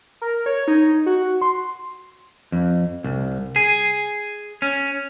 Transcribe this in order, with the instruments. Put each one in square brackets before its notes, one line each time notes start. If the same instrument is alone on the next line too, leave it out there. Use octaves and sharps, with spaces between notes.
[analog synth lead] A#4
C#5
D#4
F#4
C6
[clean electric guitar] F2
C2
G#4
C#4